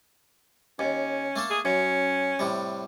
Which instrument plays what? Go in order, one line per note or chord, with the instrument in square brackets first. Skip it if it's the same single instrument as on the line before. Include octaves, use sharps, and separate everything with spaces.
[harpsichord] D#2 [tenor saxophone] C#4
[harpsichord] A3 A#3 A4
[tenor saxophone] G#4
[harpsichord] F#2 [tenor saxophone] C#4
[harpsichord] A2 C3 G3